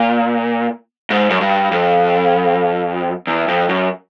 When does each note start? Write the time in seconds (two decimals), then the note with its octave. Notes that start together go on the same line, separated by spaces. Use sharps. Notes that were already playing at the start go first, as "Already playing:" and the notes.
Already playing: A#2
1.10 G#2
1.30 F#2
1.41 G2
1.71 F2
3.27 E2
3.48 F2
3.69 F#2